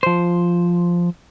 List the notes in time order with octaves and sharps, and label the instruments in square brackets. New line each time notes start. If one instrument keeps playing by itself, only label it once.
[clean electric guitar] F3 C5